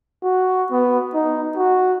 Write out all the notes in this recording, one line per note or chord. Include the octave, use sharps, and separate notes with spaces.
F#4
B3
D#4
F#4